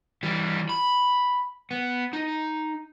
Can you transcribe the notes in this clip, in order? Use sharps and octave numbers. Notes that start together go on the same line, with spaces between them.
E3 G3
B5
B3
D#4